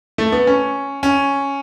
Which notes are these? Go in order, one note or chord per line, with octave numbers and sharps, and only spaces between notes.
A3
B3
C#4
C#4